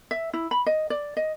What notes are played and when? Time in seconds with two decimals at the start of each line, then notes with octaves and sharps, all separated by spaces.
0.11 E5
0.33 E4
0.51 B5
0.66 D#5
0.90 D5
1.17 D#5